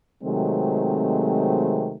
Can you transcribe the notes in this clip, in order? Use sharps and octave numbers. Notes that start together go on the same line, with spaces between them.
C3 D#3 F#3 G#3 A3 C4